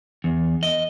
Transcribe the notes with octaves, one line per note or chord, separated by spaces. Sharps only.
E2
D#5